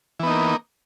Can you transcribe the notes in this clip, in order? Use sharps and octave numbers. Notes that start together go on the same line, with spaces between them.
E3 A#3 B3 D#4